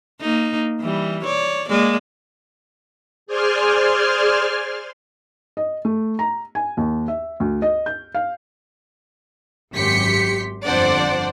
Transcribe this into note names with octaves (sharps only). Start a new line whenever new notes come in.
A#3 D#4
E3 G3
C#5 D5
G#3 A#3 D5
G#4 C5 D5 G#5 C6 F6
D#5
A3
A#5
G#5
D#2
E5
D2
D#5
G6
F5
G#1 F#2 G4 C6 B6 C#7
G1 F2 D4 C5 D5 F#5